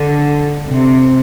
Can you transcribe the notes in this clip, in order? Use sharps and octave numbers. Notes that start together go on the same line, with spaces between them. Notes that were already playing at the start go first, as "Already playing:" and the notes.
Already playing: D3
C3